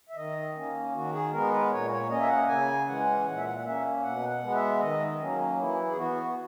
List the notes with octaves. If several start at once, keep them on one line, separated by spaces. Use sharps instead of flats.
E5
D#3 D#5
A#3 C#4
D#3 F#4
G#4
G#3 B3 A#4
B4
A#2 C#5
C#5
A#3 C#4 D#5
E5
F#5
C#3 G#5
E3 G#3 C#4 F#5
A#2 F#5
E5
F#5
F#5
A#3 C#4 E5
B2 F#5
F#5
G#3 B3
E5
D#3 D#5
F#3 A#3 C#4
E3 E4
G#4
B3 F#4
F#4